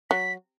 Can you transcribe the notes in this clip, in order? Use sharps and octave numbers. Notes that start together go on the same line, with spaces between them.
F#3 B6